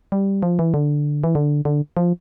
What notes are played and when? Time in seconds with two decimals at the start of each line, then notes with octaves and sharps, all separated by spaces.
0.12 G3
0.43 F3
0.59 E3
0.74 D3
1.24 E3
1.35 D3
1.65 D3
1.97 F3